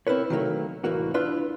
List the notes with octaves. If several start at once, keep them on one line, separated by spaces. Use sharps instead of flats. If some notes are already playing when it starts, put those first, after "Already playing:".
C4 E4 A#4 B4 C#5
D#3 E3 F#3 G3 A3 A#3
C2 A2 E3 A#3 F#4
D4 E4 F4 B4 C6